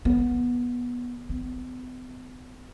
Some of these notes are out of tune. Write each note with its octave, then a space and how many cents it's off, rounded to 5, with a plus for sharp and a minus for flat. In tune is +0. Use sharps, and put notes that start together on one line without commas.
B3 -15
B3 +40